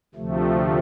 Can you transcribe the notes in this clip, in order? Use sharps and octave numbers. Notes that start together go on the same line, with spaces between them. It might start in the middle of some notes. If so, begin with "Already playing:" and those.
D2 C3 F3 A3